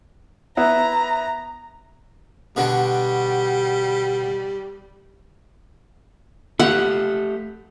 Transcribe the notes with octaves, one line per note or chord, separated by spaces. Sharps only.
B3 E4 A#5
B2 D3 G3 F#4
A3 G4 F5 F#5